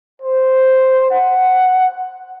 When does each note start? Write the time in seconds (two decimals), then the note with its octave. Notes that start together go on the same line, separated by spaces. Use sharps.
0.22 C5
1.11 F#5